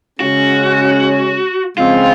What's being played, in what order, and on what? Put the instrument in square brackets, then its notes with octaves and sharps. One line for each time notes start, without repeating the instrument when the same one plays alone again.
[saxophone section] C#3 G#3 C#4 [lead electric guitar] F#4
[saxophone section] C#3 F3 G#3 C4 [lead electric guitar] F4